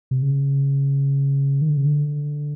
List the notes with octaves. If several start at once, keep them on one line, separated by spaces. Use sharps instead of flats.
C3
C#3
D#3
D3
C#3
D3